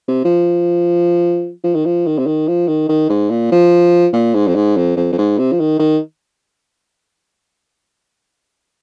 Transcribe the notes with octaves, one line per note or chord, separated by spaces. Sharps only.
C3
F3
F3
D#3
F3
D#3
C3
D#3
F3
D#3
D#3
G#2
A#2
F3
A#2
G#2
F2
G#2
F2
F2
F2
G#2
C3
F3
D#3
D#3